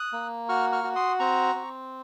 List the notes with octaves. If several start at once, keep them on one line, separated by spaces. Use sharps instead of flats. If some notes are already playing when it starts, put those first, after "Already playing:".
Already playing: D#6 F#6
A#3
F#4 C#6 F6
C#6 F6
F#4
C6 D#6
C4 A#5 C#6
C4